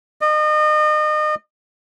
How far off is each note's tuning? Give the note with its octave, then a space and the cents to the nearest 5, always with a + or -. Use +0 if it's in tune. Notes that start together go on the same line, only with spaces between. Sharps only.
D#5 -35